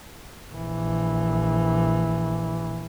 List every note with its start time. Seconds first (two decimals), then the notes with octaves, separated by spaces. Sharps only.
0.52 A#1 E3